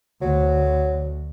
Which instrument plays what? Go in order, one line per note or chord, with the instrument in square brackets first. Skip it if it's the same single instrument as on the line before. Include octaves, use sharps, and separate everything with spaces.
[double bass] D2 [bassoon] F#3